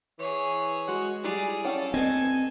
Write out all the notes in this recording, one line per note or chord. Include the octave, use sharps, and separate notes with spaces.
E3 G#4 C#5
G#3 F#4
F#3 G3 E4 G#4 D5
C#4 A4 F#5 G5
B3 C4 D#5 G#5